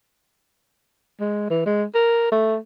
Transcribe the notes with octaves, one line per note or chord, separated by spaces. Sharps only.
G#3
E3
G#3
A#4
A3